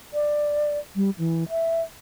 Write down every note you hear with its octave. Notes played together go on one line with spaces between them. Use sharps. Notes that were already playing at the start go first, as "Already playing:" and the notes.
D5
G3
E3
E5